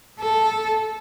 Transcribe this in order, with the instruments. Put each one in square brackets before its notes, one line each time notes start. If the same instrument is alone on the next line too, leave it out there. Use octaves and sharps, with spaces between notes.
[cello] A4